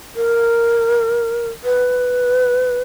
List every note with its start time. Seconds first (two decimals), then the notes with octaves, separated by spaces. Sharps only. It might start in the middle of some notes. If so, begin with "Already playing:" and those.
0.15 A#4
1.63 B4